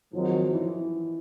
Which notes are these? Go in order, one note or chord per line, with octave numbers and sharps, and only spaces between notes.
G#1 G#2 D#3 F3 F#3
E3